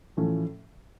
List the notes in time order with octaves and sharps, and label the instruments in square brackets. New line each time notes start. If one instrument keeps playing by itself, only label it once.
[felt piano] A2 F3 A3 C#4 [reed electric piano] E3